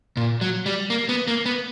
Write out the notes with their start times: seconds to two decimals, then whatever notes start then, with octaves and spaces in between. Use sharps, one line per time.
0.17 A#2
0.41 F#3
0.66 G3
0.90 A#3
1.09 B3
1.27 A#3
1.46 B3